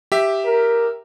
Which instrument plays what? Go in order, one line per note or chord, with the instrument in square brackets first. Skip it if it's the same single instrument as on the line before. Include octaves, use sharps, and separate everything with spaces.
[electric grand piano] G4 E5
[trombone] A#4